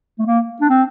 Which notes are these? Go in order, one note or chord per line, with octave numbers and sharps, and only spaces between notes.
A3
A#3
D4
C4